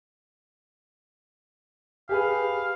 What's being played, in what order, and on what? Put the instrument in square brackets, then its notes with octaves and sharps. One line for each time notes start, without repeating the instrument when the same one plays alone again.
[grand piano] G4 G#4 B4 [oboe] F5